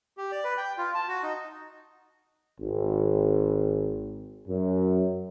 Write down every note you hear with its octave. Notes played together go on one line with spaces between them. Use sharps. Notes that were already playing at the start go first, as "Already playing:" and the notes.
G4
D5
B4
G5
F4
A5
F#4
D#4
G#1
F#2